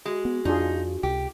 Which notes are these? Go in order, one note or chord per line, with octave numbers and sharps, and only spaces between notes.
G#3 F#4
B3
F2 D4 D#4 F4 G#4
C#2 C3 G4